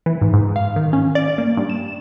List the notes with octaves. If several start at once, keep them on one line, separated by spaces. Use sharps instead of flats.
E3
G#2
G#2
F5
D#3
C#4
D5
A#3
G2
E7